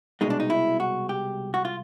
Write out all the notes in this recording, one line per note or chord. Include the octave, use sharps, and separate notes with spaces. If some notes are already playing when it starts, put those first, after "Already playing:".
C2 B2 G#3 D#4
D4
D#4
E4
F#4
G4
F#4
F4